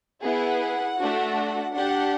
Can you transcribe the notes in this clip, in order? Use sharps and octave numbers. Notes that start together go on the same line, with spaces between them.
B3 E4 G#4 F#5
A3 D4 F#4
D4 G4 F#5